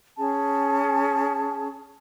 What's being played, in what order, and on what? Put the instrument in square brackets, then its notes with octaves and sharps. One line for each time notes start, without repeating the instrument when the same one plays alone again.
[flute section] C#4 G#4 A5